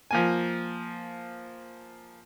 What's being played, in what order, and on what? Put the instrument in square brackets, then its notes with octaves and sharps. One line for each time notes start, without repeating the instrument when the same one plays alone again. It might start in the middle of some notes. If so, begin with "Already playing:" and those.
[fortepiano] F3 A#3 G#5